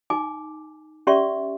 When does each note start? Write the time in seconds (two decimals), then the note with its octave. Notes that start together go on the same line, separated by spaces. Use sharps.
0.10 D#4 G#5 D6
1.07 C#4 G4 D5 E5 C6 C#6